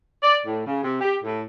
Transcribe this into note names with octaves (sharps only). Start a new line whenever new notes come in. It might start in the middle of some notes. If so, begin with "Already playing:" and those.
D5
A2
C#3
C3
G4
A2